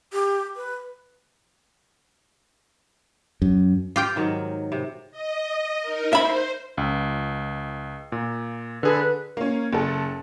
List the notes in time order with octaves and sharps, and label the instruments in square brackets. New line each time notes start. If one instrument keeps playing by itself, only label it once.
[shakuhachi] G4
B4
[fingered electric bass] F#2
[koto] F4 G4 G5
[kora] G#2 D#3 F#3
C3
[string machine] D#5
D#4 A#4
[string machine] C5 [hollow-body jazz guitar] E5 B5
[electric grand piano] C#2
A#2
[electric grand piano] D3 G#4 A4 [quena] B4
[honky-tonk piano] A#3 C#4
F#1 A4